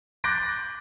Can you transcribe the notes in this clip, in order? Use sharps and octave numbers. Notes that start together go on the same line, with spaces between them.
D6 F#6 G6 A6 A#6 D7